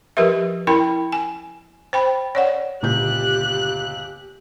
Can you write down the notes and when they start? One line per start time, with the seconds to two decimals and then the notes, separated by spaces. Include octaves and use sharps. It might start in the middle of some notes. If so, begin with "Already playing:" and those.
0.17 F3 G4 A#4 B4 E5
0.67 E4 A#4 G5 B5
1.12 G#5
1.93 C5 G5 B5
2.35 C#5 D5 F#5
2.83 G1 C#2 A#2 G4 F#6 G6